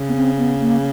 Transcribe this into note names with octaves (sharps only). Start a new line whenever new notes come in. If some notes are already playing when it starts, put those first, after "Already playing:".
Already playing: C#3
B3
C4
B3
A#3